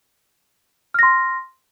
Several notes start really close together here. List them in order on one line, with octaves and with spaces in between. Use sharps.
F6 A#6 C6